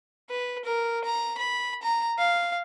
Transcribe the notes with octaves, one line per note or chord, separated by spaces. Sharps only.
B4
A#4
A#5
B5
A#5
F5